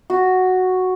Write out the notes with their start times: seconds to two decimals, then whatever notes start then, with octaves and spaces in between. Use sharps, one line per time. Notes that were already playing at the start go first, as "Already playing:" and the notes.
0.10 F#4